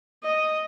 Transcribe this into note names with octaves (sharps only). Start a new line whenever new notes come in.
D#5